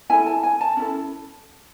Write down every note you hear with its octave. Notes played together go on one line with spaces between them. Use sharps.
E4 A4 G#5
A5
G#5
A5
C#4 E4 A4 A5